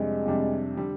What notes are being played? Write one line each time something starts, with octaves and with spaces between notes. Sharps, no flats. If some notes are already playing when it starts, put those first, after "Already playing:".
Already playing: F2 C3 G3 G#3 D4
F2 C3 G3 D4
D3 G3